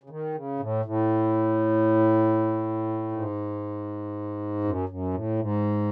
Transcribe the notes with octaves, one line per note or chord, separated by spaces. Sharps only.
C#3
D#3
C#3
A2
A2
G#2
F#2
F#2
A2
G#2